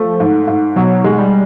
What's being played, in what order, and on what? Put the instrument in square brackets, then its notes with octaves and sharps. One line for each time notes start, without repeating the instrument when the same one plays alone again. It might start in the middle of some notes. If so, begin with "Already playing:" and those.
Already playing: [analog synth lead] F3 [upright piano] A3
[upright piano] G#2
G#2
[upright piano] B2 [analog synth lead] F#3
[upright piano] G#3
[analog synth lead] G3